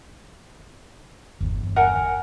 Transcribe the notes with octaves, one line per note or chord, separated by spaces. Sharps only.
G1 E2
A#4 F#5 G#5